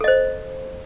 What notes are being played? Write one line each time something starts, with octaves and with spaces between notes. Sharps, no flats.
A4 C5 D#5